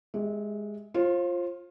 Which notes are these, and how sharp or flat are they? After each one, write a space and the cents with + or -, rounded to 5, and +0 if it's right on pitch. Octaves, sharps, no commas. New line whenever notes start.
G#3 +0 G4 +0 E5 -25
F4 +0 C5 +35